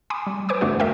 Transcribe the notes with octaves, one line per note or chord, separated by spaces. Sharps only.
G#5 B5 C6 D6 D#6
G3
B4 C5 G#5 D6 D#6
G1 E2 A3 D4 F#4
A#4 E5 F5 G5